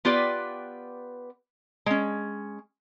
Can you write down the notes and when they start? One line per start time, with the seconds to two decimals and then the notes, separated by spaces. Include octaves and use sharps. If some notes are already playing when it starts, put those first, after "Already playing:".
0.05 B3 F4 G4 B4 D5
1.86 G#3 C#4